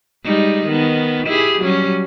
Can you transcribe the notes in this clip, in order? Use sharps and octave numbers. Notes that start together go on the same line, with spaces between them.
G3 G#3 D#4
D#3 B3
E4 G4 G#4
F#3 G3 C#4